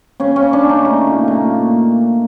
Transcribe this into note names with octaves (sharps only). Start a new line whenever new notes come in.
C#3 C#4
C#4
C#3
D4
C#3
D#4
A3
A#2
A#2